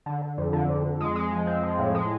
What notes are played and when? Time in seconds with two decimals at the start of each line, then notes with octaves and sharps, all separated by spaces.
0.06 D3
0.22 D3
0.38 F2
0.53 D3
0.69 F2
0.84 F2
1.01 G#3
1.16 G#3
1.32 F3
1.47 C4
1.63 F3
1.79 A2
1.95 G#3